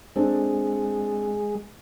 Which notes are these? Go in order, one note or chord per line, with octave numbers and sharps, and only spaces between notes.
G#3 C4 D4 A4